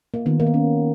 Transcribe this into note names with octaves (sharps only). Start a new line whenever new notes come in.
A#3
D#3 A#3 B3
A#3
B3
C#4